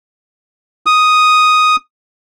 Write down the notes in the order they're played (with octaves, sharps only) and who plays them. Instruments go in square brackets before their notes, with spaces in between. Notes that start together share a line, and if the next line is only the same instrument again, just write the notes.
[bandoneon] D#6